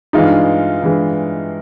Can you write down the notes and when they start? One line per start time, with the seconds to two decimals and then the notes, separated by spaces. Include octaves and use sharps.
0.13 G2 E3 G#3 D#4 F4
0.82 G2 E3 G#3